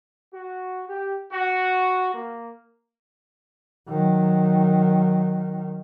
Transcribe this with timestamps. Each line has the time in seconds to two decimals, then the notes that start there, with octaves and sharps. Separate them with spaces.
0.33 F#4
0.89 G4
1.32 F#4
2.13 A#3
3.89 D#3 F#3